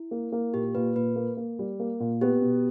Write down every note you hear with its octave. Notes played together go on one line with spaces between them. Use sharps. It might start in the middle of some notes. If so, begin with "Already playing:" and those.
Already playing: E4
A#3
A#3
A#2 G4
A#2 B4
A#2 B4
A#3
A#3
G3
A#3
A#2
B3 G4
B2